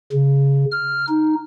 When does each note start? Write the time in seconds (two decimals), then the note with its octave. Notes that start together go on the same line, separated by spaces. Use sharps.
0.13 C#3
0.71 F6
1.08 D#4